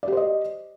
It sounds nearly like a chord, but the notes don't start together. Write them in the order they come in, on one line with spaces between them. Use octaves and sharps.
D5 G4 C5 D#5